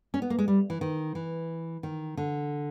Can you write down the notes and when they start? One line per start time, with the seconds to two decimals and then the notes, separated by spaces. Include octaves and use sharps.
0.14 C#4
0.22 B3
0.30 A#3
0.39 G#3
0.48 G3
0.70 E3
0.81 D#3
1.15 E3
1.83 D#3
2.17 D3